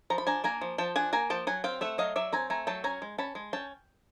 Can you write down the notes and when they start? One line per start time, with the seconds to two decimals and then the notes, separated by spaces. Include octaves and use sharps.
0.10 F3 A#5
0.18 B5
0.27 D4 G#5 A#5
0.44 A#3 G#5 A#5
0.61 F3
0.78 F3 G5 A5
0.96 D4 F#5 G#5
1.13 A#3 G#5 A#5
1.30 F3 G5 A5
1.47 F#3 F#5 G#5
1.64 C4 F5 G5
1.81 A3 E5 F#5
1.98 F#3 D#5 F5
2.16 F#3 D5 E5
2.32 C4 G#5 A#5
2.50 A3 G#5 A#5
2.67 F#3 G5 A5
2.84 C#4 G#5 A#5
3.02 G#3
3.18 C#4 A5 B5
3.35 G#3
3.53 C#4 G5 A5